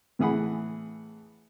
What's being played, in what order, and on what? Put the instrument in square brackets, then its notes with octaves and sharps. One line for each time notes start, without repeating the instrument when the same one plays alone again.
[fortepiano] A2 E3 G#4 F#5 B5